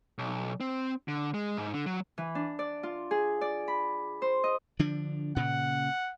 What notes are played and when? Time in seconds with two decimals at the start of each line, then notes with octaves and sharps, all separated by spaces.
0.18 B1
0.60 C4
1.08 D3
1.34 G#3
1.58 G#2
1.73 D3
1.86 F#3
2.18 E3
2.35 D4
2.59 D5
2.83 F4
3.11 G#4
3.41 D5
3.68 B5
4.22 C5
4.44 D#5
4.79 D3 F3 D4
5.36 A#2 C#3 F#5